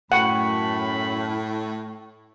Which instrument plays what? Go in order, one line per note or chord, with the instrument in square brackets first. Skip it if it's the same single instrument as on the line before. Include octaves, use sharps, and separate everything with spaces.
[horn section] F#2 B5 [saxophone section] A2 [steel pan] F#5 [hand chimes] G5 C#6